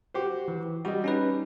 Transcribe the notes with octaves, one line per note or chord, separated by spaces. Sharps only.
F#4 G4 C5
E3
G3 F#4 D#5
C#4 D#4 B4